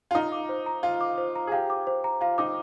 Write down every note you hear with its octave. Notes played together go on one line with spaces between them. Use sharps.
F4
D#4 F5
D6
C5
A#5
F4 F5
D6
C5
A#5
G#4
G4 F5
D6
C5
A#5
F4 F5
D#4 D6